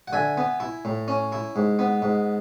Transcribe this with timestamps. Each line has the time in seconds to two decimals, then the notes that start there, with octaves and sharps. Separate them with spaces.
0.08 F#5
0.13 D3 E5 G#5
0.38 B3
0.60 E4
0.85 A2
1.08 C#4
1.32 E4
1.56 G#2
1.79 B3
2.02 G#2